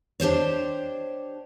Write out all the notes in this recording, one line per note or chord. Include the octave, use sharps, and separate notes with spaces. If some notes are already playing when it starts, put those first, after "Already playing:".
D4 G4 C5 C#5